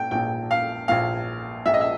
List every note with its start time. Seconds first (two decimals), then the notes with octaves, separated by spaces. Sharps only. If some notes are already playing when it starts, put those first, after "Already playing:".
Already playing: A#2 G5
0.11 A#1 A#2 G5
0.51 F5
0.88 A#1 A#2 F5
1.65 A#1 A#2 E5
1.74 D#5
1.81 E5